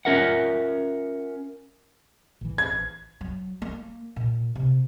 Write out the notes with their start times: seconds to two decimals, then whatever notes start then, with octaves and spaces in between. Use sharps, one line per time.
0.05 C#4 F4 A#4 E5 F#5
2.41 A1 E3
2.58 G#6
3.21 F#3
3.62 A#3
4.16 A#2
4.55 C3